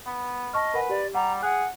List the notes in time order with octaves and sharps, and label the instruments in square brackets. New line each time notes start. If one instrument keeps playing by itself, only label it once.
[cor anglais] B3
[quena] D#5 [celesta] A5 C#6 F6
[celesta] A#4 F#5 G#5 [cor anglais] B4
[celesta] G4 [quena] D5
[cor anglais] G3 [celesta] F#5 [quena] A#5
[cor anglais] G#4 [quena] F#5 [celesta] F#6